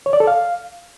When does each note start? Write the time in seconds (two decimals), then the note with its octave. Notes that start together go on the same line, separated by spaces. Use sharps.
0.06 C#5
0.13 D5
0.20 A4
0.27 F5